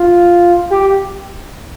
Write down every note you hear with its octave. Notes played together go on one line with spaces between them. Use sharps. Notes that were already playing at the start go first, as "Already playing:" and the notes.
Already playing: F4
G4